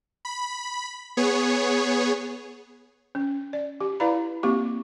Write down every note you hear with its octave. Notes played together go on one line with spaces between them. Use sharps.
B5
B3 G#4 C#5
C#4
D5
G4
E4 B4 D5 F5 A#5 B5
A#3 C4 G4 C#6